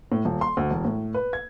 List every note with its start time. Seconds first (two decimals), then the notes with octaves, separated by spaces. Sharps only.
0.12 A2
0.25 D#1
0.41 C6
0.57 D2
0.70 E1
0.85 A2
1.14 B4
1.33 G#6